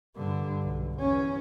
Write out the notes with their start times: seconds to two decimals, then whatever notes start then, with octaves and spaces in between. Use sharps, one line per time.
0.16 G2 D3
0.62 B1
0.98 E2 C#4